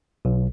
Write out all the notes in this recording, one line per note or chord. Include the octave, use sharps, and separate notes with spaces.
B1